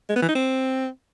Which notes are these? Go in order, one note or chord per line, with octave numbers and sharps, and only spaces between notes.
G#3
B3
E3
D#4
C4